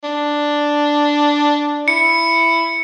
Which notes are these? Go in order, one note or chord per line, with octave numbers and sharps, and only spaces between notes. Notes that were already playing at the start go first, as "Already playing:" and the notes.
D4
E4 C#7